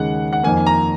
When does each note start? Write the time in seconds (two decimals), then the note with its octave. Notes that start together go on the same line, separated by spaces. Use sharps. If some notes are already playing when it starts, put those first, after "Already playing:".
Already playing: D#2 C#3 G#3 F#5
0.33 F#5
0.43 F2 D#3 A#3 G#5
0.67 A#5